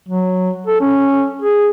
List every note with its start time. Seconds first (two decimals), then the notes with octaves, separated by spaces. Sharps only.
0.08 F#3
0.67 A4
0.81 C#4
1.42 G#4